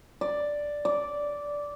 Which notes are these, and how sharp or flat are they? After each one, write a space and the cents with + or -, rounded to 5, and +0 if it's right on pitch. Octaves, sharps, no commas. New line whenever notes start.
D5 +0
D5 -10